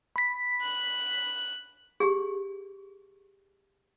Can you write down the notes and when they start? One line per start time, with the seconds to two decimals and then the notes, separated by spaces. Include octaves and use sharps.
0.16 B5 B6
0.62 F#6
2.00 G4 G#4